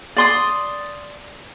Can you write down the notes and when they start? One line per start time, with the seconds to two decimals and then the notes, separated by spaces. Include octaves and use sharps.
0.17 D5 C6 D#6